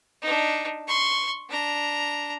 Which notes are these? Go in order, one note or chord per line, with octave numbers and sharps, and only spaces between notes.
D4 D#4
C6 C#6
D4 A#5